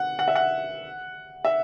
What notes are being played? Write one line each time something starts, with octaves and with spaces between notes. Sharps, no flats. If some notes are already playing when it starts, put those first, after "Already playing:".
Already playing: F#5
F#5
E5
F#5
E5